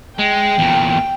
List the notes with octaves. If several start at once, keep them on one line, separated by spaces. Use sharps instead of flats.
G#3 G5
E2 A#2